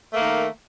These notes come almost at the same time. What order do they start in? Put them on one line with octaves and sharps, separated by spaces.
A3 A#3 D#3